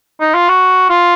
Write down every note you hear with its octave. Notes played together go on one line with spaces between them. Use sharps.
D#4
F4
F#4
F4